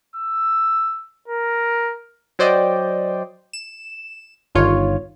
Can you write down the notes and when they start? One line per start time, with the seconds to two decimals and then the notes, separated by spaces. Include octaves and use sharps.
0.16 E6
1.28 A#4
2.39 F#3 C5 D5 D#5 G5
3.53 E7
4.55 G1 D#3 F4 C#5